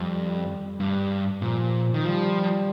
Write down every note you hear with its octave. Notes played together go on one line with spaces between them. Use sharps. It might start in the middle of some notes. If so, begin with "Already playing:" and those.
Already playing: F2 G3
G2
A#2 F3
D#3
F3 G3